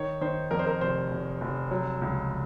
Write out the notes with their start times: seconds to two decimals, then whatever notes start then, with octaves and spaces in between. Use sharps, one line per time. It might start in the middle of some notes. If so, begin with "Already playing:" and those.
Already playing: D#3 C#5
0.21 D#3 C5
0.51 F2 A#4
0.59 C5
0.66 A#4
0.81 F1 C5
1.11 F1
1.41 F1
1.71 F#3
2.02 C#2